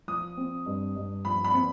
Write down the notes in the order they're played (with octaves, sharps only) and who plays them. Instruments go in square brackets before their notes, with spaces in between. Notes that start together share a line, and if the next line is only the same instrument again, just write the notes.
[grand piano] F3 [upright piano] D#6
[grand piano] C4
G2
G2
[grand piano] F3 [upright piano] B5
[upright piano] B5
[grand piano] C4